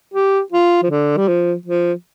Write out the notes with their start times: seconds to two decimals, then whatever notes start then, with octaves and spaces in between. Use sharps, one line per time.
0.14 G4
0.52 F4
0.83 F3
0.90 D3
1.17 G3
1.28 F3
1.66 F3